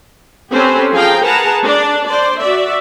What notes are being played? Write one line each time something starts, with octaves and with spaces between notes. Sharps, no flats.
C4 C#4 G4 A4 B4 C5
F3 G#4 F5 G5 A#5
G#4 A#4 B4 F#5 A5 A#5
D4 D5
C5 D5
F#4 D5 E5